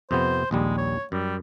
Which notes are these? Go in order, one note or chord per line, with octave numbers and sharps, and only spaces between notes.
F2 C3 B3 C5
A#1 D#2 G3 G#3
C#5
F#2 G3